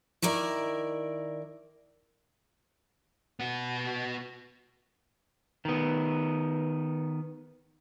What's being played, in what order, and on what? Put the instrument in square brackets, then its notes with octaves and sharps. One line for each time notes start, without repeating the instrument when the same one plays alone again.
[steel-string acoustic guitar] D#3 E4 A#4 D5
[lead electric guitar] B3 F#4
[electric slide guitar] D#3 B3